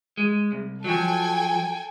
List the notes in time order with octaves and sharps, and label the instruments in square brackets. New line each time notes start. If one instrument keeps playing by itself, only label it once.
[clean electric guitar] G#3
C2
[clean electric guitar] F3 F#3 [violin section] A4 G5 G#5